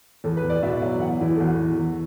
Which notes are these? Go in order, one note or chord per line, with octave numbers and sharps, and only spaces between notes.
E2 A4
B4
E2
D5
B2 E5
F#3 E5
E3 F#5
E2 E4
A4
E2 F#4
E2
E2